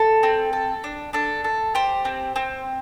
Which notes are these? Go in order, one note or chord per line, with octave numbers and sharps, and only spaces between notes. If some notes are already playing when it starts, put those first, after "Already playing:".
Already playing: A4
C4
A4
D4
D4 A4
A4
G4 C5
C4
C4